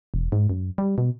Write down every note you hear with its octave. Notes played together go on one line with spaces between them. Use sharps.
E1
G#2
F#2
G3
B2